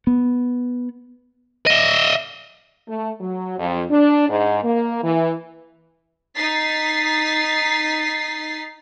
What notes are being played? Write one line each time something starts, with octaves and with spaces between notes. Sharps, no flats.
B3
D#5 E5
A3
F#3
F2
D4
G#2
A#3
E3
D#4 A6 B6 C7